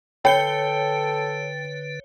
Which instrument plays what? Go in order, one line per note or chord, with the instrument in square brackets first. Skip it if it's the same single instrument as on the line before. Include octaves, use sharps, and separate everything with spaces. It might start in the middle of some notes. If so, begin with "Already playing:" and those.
[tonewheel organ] D3 B4 [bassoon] A4 [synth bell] C#5 C#7 G7 [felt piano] G5